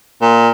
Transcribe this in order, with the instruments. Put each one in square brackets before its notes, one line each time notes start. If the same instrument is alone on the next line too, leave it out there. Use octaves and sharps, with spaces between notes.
[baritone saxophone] A#2